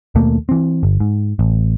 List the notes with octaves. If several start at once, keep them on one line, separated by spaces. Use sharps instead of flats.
D#2 B2 A3 A#3
E3 C4
G1
G#2
A1